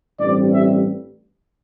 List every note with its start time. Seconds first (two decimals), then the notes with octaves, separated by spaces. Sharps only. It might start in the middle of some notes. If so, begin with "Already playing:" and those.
0.19 A1 G2 G3 C4 D5
0.52 E5